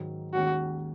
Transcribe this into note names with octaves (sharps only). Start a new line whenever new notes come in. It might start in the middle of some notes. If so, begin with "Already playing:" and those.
Already playing: G#2 D#3 F#3
D#2 D#3 G#3 C#4 F#4